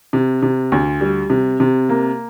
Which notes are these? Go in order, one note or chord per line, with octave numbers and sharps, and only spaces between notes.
C3
C3
D2
G3
C3
C3
A#3